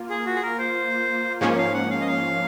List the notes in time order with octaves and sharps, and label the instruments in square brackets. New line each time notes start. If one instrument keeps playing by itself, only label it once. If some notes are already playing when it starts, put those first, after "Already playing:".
Already playing: [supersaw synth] A#3 F4
[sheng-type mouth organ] G#4
F#4
G#4
A#4
C5
[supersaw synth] G#2 F3 A#3 C#4 [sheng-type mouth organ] C#5
[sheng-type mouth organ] F5
F#5
F5
D#5
F5